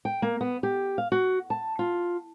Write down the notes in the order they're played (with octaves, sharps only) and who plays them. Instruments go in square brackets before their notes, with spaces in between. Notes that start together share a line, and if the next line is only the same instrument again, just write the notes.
[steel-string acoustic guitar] G5
A#3
B3
G4
F5
F#4
A5
F4